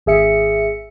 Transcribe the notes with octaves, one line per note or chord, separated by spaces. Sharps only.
G#1 G#4 E5 C#7